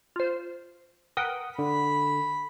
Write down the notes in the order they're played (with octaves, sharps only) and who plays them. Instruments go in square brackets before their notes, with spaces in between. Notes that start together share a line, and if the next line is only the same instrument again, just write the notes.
[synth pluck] F4 C5
[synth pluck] A#4 B4 G5 [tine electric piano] F#5 D#6
[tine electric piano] D3 [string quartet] B5